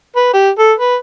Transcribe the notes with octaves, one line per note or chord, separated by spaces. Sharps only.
B4
G4
A4
B4